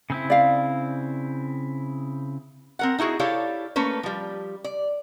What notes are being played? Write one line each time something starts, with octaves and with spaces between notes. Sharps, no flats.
C#3 C4 E4
D5 F5
C4 A#4 F#5
D#4 E4 F#4 G#4
E4 G4 A4 C#5 D5 F5
A3 A#3 C#4 B4
F3 G3
D5